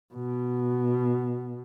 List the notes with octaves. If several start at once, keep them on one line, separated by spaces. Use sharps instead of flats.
B2